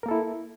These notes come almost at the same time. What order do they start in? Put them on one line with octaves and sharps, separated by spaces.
A#4 A#3 A4 E4